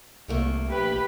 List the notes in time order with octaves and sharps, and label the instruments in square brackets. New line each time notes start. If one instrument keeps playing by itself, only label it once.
[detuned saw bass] C2 [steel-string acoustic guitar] D#3 A3 A#3
[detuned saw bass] A#1 [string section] G4 B5 [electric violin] B4